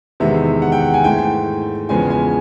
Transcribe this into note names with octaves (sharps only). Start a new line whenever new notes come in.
E2 C3 D#3 G#3 B3 E5
F#5
G5
F#5
G#5
G#2 E3 A3 G5
E2 C#3 F3 G#3 B3 G#5
G#5